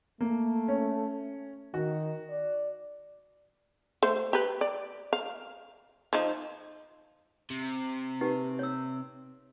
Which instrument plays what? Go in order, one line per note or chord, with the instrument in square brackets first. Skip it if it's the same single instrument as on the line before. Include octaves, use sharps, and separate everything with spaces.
[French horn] A3 [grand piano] A#3
[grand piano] C#4
[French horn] D#3 [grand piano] F#4
[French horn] D5
[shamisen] A3 C5
G4 B4
D5
F5
F3 D#4
[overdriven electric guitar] C3
[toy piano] D#4 G4 B4
C#5 E6